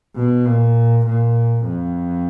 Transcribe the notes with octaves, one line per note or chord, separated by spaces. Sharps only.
B2
A#2
A#2
F2